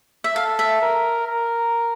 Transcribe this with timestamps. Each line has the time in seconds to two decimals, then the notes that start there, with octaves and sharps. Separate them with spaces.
0.24 E5
0.36 A4 F5
0.59 E5
0.82 A#4
1.27 A#4